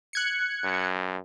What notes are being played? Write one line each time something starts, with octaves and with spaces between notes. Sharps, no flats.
F#6 G#6 C#7
F#2